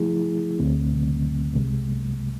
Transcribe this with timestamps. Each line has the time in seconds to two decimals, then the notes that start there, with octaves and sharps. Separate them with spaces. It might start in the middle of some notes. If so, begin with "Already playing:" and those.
Already playing: F3 A3 E4 G#4
0.59 D2 D3 A3 C4
1.53 C2 C3 G#3